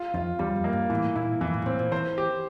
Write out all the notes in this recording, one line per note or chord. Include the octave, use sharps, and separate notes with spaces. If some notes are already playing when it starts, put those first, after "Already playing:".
Already playing: F4
F2 F4
E2 G3
E2
F2
A#3
G2
A2 E3
A#2 E4
F2 E3
A2
G2
A2 C4
A#2
E3 C5
G4